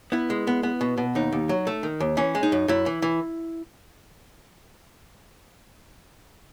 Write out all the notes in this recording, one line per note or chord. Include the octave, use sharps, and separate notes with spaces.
B3 E4
G#3
B3
B3
B2
B2
D#2 D#4
D#2
F#3
A3
D#3
D#2
E3 C#4
G#3
D#4
F#2
F#2 E4
E3
E3